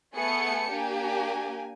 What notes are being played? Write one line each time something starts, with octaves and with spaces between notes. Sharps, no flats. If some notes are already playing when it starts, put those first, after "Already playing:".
A3 B3 G#4 G#5 A5 C#7
A#3 D4 G4 G#5